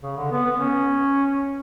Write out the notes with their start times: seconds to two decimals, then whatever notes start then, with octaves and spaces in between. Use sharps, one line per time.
0.03 C#3
0.17 D3
0.31 B3
0.45 B3
0.59 C#4